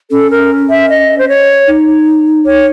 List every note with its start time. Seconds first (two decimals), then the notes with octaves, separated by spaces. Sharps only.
0.11 C#4 A4
0.30 A#4
0.70 E5
0.89 D#5
1.18 C5
1.29 C#5
1.67 D#4
2.46 C#5